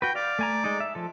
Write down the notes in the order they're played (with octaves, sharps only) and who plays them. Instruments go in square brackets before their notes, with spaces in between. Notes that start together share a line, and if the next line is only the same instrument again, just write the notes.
[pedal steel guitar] F#4 B4 [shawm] G5
[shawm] D5 [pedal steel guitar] F5
[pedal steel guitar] A3 G#5 A#5
G#3 D#4
E5
F3 A4